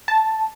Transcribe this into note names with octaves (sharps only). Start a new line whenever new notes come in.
A5